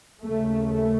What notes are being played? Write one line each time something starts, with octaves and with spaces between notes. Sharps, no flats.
D#2 C#3 A3
A3